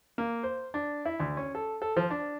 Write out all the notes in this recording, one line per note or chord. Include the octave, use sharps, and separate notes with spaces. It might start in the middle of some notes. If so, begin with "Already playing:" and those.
A#3
C5
D4
E4
D2
C#4
A4
A4
F3
D4